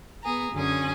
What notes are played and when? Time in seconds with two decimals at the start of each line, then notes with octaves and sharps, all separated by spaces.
0.22 B3 G#4 A#5
0.53 F#2 D3 C#4 G#4 G#5